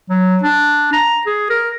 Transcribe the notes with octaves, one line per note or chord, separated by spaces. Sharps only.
F#3
D4
A#5
G#4
A#4